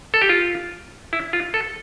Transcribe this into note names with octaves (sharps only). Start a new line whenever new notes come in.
A4
G4
F4
E4
F4
A4